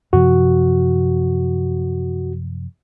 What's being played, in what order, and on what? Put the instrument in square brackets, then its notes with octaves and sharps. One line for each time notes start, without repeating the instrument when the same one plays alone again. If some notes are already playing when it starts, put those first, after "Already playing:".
[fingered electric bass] F#2 C3 F3 [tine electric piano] F#4